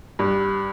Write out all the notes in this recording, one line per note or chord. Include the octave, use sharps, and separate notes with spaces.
G2